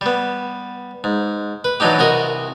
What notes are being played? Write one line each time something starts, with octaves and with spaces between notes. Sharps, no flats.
G3 B3
G#2
B4
E3 F#3 D4 D#4 G4
C2 F#4 A#4 D#5 C#6